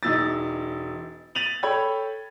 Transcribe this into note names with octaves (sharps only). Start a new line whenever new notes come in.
E1 E3 D#4 E6 A6
A6 D#7 F7 F#7
A4 C#5 G5 B5 G#6